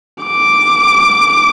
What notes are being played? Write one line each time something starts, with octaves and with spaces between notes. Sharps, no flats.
D6